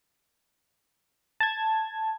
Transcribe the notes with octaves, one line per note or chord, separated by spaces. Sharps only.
A5 G#6